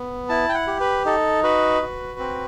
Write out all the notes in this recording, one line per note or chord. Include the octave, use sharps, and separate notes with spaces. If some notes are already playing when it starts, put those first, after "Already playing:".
Already playing: B3
E4 A5
G5
F#5
G4
B4
D#4 A4
F#4 B4
F#4
C4